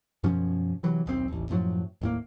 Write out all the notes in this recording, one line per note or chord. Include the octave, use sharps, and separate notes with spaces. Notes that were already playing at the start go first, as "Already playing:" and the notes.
F#2 B2 F3 C#4
C3 E3 F#3
D#1 B1 A2 C4
D#1 A1
F#2 A2 F3 F#3
D#1 A2 A#3